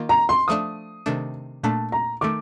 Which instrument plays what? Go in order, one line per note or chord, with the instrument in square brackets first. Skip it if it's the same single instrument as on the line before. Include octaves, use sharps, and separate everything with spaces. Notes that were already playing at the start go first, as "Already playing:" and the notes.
Already playing: [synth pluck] D#3 A#3 F4
[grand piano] A#5
C6
[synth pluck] F3 A3 D4 [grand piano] D#6
[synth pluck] C3 D#3 A3 D4
[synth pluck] A#2 A3 D4 [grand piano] A5
[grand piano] A#5
[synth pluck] D#3 A3 [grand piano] D6